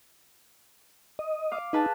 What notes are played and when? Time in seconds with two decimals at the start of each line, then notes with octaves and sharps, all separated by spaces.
1.19 D#5
1.51 F5 D6
1.73 D#4 G#4 B4 A5